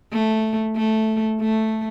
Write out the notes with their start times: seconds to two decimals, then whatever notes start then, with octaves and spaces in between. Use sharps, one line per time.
0.12 A3
0.76 A3
1.41 A3